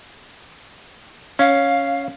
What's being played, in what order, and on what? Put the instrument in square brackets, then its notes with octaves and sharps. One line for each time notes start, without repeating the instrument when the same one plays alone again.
[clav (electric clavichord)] C#4 [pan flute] F5